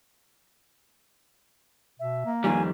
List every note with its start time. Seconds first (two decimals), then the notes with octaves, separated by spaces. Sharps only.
2.00 B2 E5
2.26 A#3
2.44 F2 D#3 G3 G#5